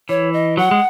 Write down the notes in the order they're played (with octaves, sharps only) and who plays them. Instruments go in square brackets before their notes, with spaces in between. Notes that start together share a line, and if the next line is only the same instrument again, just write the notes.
[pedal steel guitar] E3 [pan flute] C#5
[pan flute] D#5
[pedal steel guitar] F#3 [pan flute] F#5
[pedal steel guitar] G#3